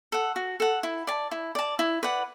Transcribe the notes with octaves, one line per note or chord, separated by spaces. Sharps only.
A4 F#5
F#4
A4 F#5
E4
D5 A5
E4
D5 A5
E4
B4 D5 F#5